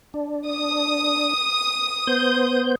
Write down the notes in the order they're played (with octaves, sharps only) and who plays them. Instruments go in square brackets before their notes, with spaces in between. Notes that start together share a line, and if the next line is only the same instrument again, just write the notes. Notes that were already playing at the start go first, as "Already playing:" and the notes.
[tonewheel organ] D4
[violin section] D#6
[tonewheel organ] B3 C5 G6